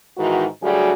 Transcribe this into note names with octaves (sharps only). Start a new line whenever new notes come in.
G#2 D#3 E3 F#4
D2 F#3 G3 F#4 G#4